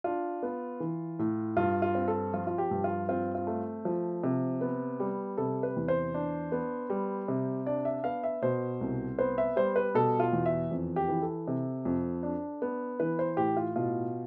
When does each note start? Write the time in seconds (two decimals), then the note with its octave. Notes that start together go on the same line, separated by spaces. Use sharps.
0.04 D4 F4
0.43 B3
0.80 E3
1.19 A2
1.57 G2 F4
1.82 F4
1.95 C4
2.08 A4
2.34 F3 F4
2.47 F4
2.58 G4
2.71 G2
2.84 F4
3.09 C4 F4
3.35 F4
3.47 A3
3.85 F3
4.24 C3
4.61 B3
5.00 G3
5.38 C3 A4
5.63 B4
5.76 E2
5.88 C5
6.14 D4
6.52 B3
6.90 G3
7.28 C3
7.66 D4 D5
7.85 E5
8.04 B3 F5
8.24 E5
8.42 B2 C5
8.81 C2
9.19 B3 C5
9.38 E5
9.56 G3 C5
9.76 B4
9.95 B2 A4
10.20 F4
10.33 E2
10.46 E5
10.71 F2
10.96 G4
11.09 E3
11.22 A4
11.48 C3
11.85 F2
12.23 D4
12.62 B3
13.00 E3 B4
13.19 C5
13.37 A2 G4
13.57 F4
13.76 B2 F4